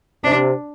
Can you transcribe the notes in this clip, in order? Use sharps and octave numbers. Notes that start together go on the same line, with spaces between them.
C3 D4